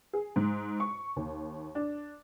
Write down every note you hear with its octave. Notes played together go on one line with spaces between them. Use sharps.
G#4
G#2
C#6
D#2
D4